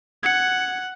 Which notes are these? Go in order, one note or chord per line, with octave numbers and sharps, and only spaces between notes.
F#5 G#6 C#7